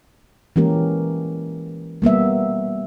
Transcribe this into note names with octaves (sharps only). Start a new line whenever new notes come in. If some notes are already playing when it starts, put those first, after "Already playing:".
E3 G#3 A#3 C#4 G4 A#4
G3 A#3 B3 E5